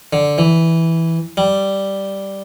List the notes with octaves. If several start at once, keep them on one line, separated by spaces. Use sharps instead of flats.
D3
E3
G3